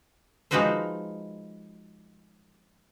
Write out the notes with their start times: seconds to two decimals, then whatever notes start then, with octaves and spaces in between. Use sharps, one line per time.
0.51 F3 G#3 D#4 F#4 B4 C5